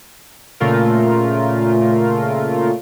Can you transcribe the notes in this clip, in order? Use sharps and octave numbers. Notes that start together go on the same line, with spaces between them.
A#2 C#3 A3 F4 A#4